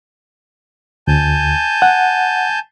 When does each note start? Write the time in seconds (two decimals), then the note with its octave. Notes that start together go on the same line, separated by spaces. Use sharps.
1.08 D2 G#5 A5 G6
1.82 F#5